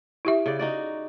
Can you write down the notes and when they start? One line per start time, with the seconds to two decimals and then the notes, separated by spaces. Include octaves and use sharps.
0.25 E4 G4 E5
0.46 C#3 D5
0.59 D#4 F#4 D5